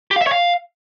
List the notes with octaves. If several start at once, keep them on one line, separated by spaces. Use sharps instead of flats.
G4
F5
E5
C#5
F5